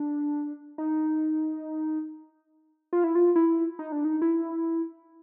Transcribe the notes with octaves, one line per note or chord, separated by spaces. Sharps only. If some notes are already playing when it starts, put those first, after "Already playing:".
Already playing: D4
D#4
F4
E4
F4
E4
D#4
D4
D#4
E4